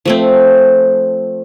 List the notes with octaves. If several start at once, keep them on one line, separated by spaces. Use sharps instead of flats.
F3 A3 C4